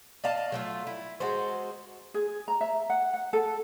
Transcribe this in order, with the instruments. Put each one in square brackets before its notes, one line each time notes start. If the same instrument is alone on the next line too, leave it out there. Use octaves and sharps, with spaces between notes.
[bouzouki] D5 D#5 F5 A5
F#3 A3 F4
E4
G#3 F#4 A4 C5
[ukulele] G#4
A#5
E5
F#5
F#5
A4